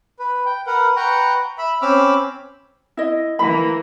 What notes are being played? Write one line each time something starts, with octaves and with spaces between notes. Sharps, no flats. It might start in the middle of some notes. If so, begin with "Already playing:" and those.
B4
G5
A#4 B4 F#5
B4 F#5 G5 A#5 C#6
E5 B5
C4 C#4 B5 D6 E6 F6
E4 D#5
E3 A#3 B5